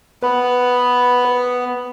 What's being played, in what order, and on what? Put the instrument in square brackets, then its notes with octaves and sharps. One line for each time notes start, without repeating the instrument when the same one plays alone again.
[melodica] B3 [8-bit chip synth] B4 B5